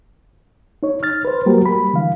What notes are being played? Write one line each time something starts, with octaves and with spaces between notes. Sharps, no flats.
D#4 C#5
F6 A6
B4 C5
F#3 G3 A#3 F#4 G4 A#4
B5
D3 E3 G3 F5